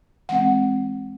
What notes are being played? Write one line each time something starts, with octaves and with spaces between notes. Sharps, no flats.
E3 G#3 C4 F#5